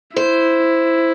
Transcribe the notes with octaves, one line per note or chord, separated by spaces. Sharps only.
E4 C5